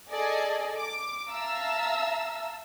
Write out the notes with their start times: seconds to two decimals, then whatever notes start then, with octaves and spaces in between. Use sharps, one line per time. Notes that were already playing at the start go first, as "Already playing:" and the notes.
0.11 G#4 A4 D5 D#5 G#5
0.77 D6
1.30 E5 F5 A5 A#5 E6